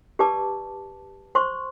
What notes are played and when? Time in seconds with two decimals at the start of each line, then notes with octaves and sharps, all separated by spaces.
0.19 G4 B4 D5 A5 D6
1.35 C5 C6 C#6